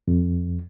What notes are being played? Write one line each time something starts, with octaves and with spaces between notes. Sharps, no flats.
F2